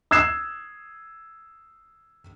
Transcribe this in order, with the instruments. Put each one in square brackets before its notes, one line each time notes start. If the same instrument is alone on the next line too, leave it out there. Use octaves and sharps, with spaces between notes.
[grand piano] D#6 E6 F#6 G#6 C7 E7